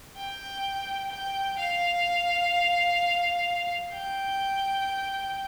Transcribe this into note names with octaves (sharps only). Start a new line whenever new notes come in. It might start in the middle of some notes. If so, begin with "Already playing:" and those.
G5
G5
F5
G5